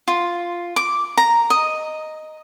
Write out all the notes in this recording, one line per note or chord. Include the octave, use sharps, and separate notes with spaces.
F4
D6
A#5
D#5